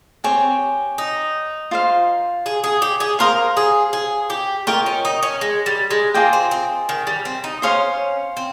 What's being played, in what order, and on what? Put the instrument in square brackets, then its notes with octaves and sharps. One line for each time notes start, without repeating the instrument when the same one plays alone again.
[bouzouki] C4 [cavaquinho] G4 C#5 G#5
[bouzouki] D#4
[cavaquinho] F4 C5 F5
[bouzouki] G#4
G#4
G4
G#4
[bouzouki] A#4 [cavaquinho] C5 F5 C6 D#6
[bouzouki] G#4
G#4
G4
[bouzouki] F4 [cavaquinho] A#4 D#5 G5 C#6
[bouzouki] C#4
D#4
C#4
G#3
G3
G#3
[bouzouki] A#3 [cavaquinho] F4 G#4 D#5 G5
[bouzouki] C4
C4
D#3
G3
C4
D#4
[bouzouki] C#4 [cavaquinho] C5 F5 C6 D#6
[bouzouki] C4